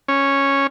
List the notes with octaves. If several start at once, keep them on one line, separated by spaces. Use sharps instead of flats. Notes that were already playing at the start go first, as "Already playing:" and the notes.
C#4